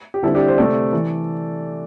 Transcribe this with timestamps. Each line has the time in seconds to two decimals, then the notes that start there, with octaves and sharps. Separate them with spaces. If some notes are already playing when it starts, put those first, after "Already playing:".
0.14 G4
0.23 D3 G3 C4 E4 A4
0.35 D4 G4
0.48 C5
0.58 C3 A3 C4 A4 D5
0.93 E3